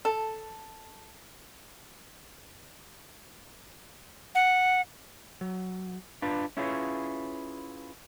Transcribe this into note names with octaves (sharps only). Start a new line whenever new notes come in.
A4
F#5
F#3
D4 F4 B4
C#4 E4 F4 G#4 B4 C#5